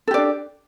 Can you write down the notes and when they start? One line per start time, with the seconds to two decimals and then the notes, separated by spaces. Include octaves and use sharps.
0.08 A4
0.11 G4
0.14 D5
0.17 D4